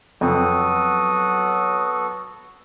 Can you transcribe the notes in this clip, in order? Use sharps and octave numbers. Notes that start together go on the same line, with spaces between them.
F2 F#3 B3 F#4 A4 D#6